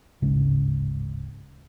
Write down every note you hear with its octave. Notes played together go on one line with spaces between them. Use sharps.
D1 G#1 C#3 G#3